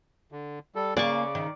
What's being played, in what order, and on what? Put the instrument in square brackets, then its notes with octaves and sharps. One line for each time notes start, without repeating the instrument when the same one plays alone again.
[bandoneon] D3
G3 A4
[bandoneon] C#3 [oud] A#3 G#4 A#4 [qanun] D5 C#6
[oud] D#3